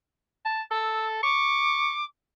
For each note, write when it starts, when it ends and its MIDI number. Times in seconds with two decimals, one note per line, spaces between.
0.45 0.62 81
0.71 1.20 69
0.71 1.06 88
1.23 1.96 85
1.23 2.05 86